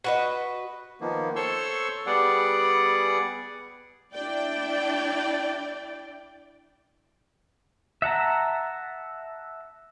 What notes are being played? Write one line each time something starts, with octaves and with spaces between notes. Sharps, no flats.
F#4 B4 D#5
D#3 F3 A#3 B3
A4 C5 C#5 C6 C#6 E6
G3 B3 G#4 D5 F#5
D4 E4 D5 G5
E5 F#5 A5 A#5